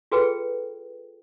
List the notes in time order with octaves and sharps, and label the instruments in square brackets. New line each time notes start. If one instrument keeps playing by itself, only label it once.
[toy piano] F4 F#4 G#4 A4 B4 G5